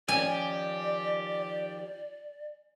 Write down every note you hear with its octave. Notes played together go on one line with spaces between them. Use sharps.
D#3 F3 C#4 G4 D5 G#5